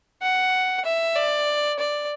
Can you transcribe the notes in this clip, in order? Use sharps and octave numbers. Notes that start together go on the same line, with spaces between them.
F#5
E5
D5
D5